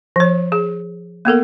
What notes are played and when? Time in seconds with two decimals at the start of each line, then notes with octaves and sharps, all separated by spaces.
0.16 F3 C#5
0.52 G#4
1.25 A#3 B3 A4 A#4